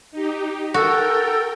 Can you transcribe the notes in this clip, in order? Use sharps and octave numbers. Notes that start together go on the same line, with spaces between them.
D#4 G4
F#4 A4 A#4 G5